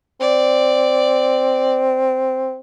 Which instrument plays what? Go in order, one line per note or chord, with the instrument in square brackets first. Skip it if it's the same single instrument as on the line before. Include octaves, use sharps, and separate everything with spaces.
[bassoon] C4 [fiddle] D5